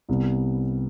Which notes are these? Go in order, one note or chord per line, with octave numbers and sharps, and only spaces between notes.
C2 C3 G3 B3